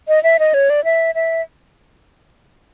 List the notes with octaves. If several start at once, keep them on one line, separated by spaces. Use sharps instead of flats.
D#5
E5
D#5
C#5
D5
E5
E5